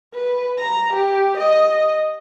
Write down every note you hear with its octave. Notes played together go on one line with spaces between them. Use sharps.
B4
A#5
G4
D#5